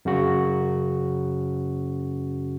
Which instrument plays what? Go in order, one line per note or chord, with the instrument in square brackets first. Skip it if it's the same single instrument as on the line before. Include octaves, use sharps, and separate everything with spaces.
[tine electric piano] F#2 C#3 F#4